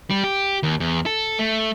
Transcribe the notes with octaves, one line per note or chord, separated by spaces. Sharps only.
G3
G4
D#2
E2
A4
A3